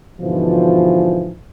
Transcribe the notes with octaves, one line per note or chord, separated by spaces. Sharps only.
G#2 B2 D3 E3 F3